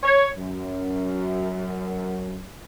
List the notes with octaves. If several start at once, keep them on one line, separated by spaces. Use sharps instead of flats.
C#5
F#2